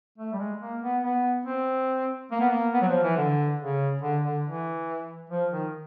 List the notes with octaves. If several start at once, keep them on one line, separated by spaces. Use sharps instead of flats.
A3
G3
G#3
A#3
B3
B3
C4
A#3
B3
A#3
B3
F#3
F3
E3
D3
C#3
D3
D3
E3
F3
D#3